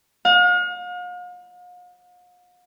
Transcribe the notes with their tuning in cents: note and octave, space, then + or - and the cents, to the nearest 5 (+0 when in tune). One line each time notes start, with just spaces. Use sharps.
F5 +45